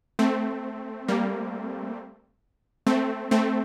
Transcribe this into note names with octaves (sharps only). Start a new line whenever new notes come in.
A3 C4
G3 A#3
A3 C4
A3 C4